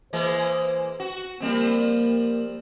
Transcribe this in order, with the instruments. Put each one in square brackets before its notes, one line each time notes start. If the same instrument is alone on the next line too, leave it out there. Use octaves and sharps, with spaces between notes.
[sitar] E3 G#3 A#3 [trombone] C5
[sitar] F#4
[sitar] F3 G3 C4 [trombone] A#3